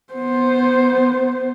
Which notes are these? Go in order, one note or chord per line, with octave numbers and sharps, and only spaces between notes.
B3 C5